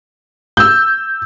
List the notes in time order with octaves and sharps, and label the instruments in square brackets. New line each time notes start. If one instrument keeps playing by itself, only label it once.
[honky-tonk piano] E6 G6